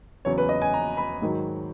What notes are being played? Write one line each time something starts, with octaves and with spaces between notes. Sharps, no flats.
E2 C#3 F#3 C#5
B4
D#5
G#5
A#5
B5
G#2 D#3 F#3